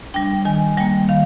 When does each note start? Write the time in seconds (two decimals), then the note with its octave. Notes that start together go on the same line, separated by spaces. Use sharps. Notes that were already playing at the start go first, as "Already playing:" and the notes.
0.14 G3 D4 G5
0.45 D#3 G#5
0.77 G3 A#3 G5
1.09 D#3 F5